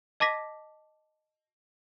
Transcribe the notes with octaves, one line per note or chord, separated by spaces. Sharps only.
D#5 A5 D6 A#6 B6